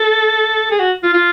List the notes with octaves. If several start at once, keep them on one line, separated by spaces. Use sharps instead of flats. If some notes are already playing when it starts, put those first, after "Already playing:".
Already playing: A4
G#4
F#4
F4
F4